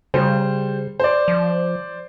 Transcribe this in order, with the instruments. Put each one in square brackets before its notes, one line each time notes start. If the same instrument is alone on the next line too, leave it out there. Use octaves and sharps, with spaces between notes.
[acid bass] C#3 [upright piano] G3 C5
[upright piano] C5 D5
[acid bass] F3